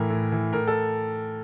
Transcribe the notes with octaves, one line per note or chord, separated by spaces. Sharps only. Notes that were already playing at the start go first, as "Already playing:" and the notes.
Already playing: A2 E3 A#4
A2
E3
A2 A#4
A4